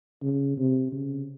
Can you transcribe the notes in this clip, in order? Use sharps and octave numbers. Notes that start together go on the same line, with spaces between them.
C#3
C3
C#3